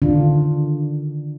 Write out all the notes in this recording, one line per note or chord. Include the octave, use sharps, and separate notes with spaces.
D3 D#3 D4 F4